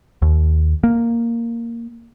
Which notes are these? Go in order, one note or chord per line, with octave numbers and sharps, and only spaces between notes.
D#2
A#3